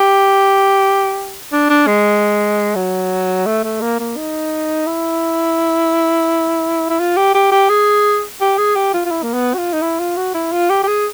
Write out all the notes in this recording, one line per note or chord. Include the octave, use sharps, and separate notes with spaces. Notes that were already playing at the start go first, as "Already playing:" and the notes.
Already playing: G4
D4
D4
G#3
F#3
A3
A3
A#3
A#3
D#4
E4
E4
F4
G4
G4
G4
G#4
G4
G#4
G4
F4
F4
E4
A#3
B3
F#4
F4
D#4
E4
F4
F#4
E4
F4
G4
G4
G#4